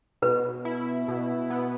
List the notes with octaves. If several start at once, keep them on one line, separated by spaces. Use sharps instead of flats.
B2 B4
E4
B2
B3